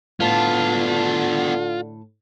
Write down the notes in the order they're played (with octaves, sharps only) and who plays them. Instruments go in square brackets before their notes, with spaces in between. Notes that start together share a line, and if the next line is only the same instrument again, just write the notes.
[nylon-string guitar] A2 A5 [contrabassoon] D3 [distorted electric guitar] B3 D4 [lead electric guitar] F4